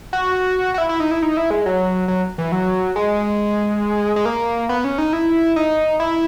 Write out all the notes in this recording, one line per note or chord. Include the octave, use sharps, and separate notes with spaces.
F#4
F#4
E4
E4
D#4
E4
D#4
E4
G#3
F#3
F#3
E3
F#3
G#3
G#3
A#3
B3
C#4
D#4
E4
D#4
E4